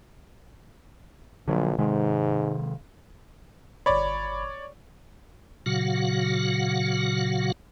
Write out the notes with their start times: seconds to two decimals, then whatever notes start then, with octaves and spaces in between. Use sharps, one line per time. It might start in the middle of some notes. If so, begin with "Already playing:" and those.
1.48 A#1 D3 F#3
1.78 G#2 C3 D#3 G#3
3.86 G1 C#5 D5 B5
5.66 A#2 C#3 F#3 F#4 F5 F#5